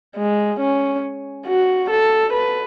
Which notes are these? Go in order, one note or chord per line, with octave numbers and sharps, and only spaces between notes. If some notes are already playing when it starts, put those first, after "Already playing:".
G#3
C#4
F#4
A4
B4